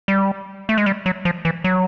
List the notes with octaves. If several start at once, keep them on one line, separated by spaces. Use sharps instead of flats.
G3
A3
G#3
G3
F#3
F3
E3
F#3